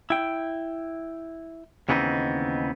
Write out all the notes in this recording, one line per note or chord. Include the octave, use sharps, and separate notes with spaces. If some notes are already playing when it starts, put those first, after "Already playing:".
E4 G5
D#2 C#3 E3 B3 C4 D#4